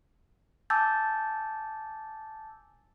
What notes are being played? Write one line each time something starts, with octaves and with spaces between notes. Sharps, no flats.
G#5 A5 D6 E6 G6 A6